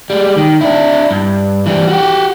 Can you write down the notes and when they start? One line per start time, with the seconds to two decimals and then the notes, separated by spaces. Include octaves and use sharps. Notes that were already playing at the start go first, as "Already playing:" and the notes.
0.10 G3 G#3
0.37 D#3
0.61 D4 E4
1.11 G2
1.66 E3 G3
1.88 F#4 G4